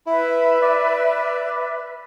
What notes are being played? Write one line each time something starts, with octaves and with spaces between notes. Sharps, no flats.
E4 B4 E5
D5